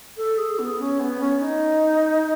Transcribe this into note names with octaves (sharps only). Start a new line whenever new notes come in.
A4
G#4
B3
C#4
B3
C#4
D#4